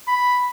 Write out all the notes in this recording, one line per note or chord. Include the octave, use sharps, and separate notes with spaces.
B5